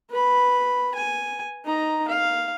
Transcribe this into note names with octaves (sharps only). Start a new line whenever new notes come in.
B4 B5
G#5
D#4 A#5
F5